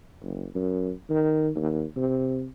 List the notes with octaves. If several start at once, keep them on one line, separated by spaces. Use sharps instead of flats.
F#1
F#2
D#3
D#2
C3